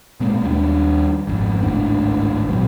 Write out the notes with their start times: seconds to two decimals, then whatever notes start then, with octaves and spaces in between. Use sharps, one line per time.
0.20 B2 G#3 A#3
0.43 D#2 G3 B3 D4
1.27 G#1 F2
1.63 G#1 C#2 A2 D4
2.48 A#2 F#3